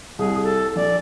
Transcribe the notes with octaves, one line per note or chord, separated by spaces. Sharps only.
C2 G#4
A4
A#1 D5